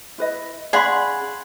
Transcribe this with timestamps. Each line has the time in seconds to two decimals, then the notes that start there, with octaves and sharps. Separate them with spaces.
0.18 E4 B4 D#5
0.73 C#4 D#4 G#4 D5 F5 F#5 B5 C6